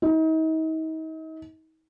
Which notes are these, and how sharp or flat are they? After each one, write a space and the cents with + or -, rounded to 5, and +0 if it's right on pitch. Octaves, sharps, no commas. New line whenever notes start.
D#4 +40